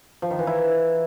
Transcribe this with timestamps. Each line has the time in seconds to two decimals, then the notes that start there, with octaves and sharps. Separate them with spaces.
0.22 F3
0.31 D#3
0.39 E3
0.47 E4